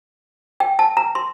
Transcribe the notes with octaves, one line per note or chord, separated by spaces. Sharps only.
G5
A5
A#5
C6